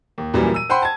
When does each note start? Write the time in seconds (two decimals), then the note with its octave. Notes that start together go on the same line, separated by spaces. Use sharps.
0.18 D#2
0.34 F#2 A#2 E3 G3
0.54 E6 D#7
0.69 C5 F#5 G5 B5 C6
0.82 A5 G#6